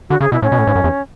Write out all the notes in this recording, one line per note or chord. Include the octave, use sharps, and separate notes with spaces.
D3 F#4
C#3 G#4
B2 E4
A2 C#4
B2
A2
G#2
F#2
E2